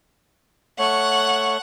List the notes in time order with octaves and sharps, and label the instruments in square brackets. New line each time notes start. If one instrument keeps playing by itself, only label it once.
[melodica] A3 C#5 [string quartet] F#5